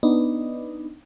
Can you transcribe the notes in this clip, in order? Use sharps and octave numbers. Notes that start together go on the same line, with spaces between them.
B3 D4 D#4